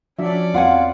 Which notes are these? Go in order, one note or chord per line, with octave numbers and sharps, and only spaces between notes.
F3 C#4 D4 F#4 D5 E5
E2 B3 C4 F4 F5 F#5 G#5